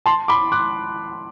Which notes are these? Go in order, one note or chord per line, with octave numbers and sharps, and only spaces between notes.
A5 C6
B5 D6
D6 F#6